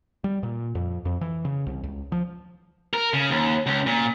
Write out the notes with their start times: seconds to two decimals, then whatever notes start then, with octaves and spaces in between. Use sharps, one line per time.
0.24 G3
0.43 A#2
0.75 F2
1.05 F2
1.21 E3
1.45 C#3
1.67 C2
1.84 C#2
2.12 F3
2.93 A#4
3.14 C#3
3.30 D#2
3.66 C#2
3.87 A#2